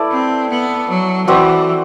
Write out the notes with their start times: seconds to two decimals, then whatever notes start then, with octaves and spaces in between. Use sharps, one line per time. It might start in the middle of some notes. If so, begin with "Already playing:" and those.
Already playing: A3 E4 B4 D5
0.11 C4
0.50 B3
0.89 F#3
1.28 E3 C4 F#4 B4 D5